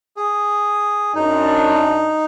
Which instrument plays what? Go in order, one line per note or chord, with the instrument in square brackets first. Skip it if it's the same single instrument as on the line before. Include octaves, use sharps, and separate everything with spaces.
[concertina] G#4
[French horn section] F#2 D4 [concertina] D#4